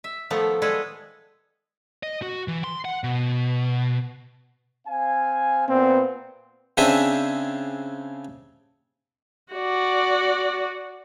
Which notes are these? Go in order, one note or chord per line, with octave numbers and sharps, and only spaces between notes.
E5
D#3 F3 A3 B3 A4
G3 G#3 G#4 A4 B4
D#5
F#4
E3
C6
F#5
B2
C4 F5 G#5
A#2 B3 C4
C#3 C4 D4 G#4 E5 G#5
F#4 D5